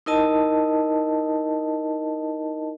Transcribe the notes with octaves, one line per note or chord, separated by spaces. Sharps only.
D#4 E4 A#4 D#5 A5